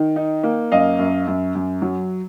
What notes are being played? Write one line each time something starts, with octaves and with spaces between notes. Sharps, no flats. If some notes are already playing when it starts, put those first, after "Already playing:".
Already playing: D#3
D#4
A#3
F#2 D#5 F5
F#2
F#2
F#2
F#3